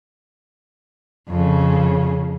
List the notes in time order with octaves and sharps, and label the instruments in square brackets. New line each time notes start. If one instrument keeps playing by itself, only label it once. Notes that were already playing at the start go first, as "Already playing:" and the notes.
[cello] F2 C#3